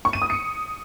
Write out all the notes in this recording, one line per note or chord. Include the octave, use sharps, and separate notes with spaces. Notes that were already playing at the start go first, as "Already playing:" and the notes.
C#6
D#7
D#6
C#7